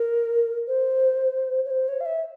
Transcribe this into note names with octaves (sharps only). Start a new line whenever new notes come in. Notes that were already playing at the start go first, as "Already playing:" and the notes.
Already playing: A#4
C5
C#5
C5
C#5
F5
E5